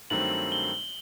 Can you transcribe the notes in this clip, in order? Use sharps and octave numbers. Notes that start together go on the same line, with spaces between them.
G2 D#3 F#3 A3 C4 F#7
G7